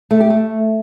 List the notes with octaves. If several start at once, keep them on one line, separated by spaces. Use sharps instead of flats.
A3
G4
A3